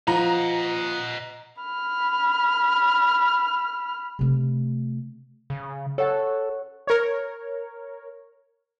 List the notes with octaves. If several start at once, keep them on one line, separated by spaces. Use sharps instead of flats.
F3 D#5 F#5 A#5
B5 F6
C3 A3
C#3
A4 C#5 F#5
A#4 C#5